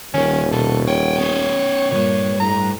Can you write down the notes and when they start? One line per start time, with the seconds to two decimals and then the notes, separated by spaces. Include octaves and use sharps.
0.14 D#1 D#3 C#4
0.52 B2 A4
0.87 C#5 F#5 G5
1.18 B3 C#4
1.91 C#2 G2 A#2 C#5
2.40 A2 A#5